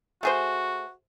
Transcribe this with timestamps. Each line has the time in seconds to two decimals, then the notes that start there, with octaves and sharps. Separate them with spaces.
0.23 A3 F#4 G#4 C5